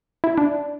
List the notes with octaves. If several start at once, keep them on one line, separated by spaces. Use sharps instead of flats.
E4
D4